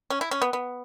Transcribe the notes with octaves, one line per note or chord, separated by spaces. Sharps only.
C#4
E4
C#4
B3
B3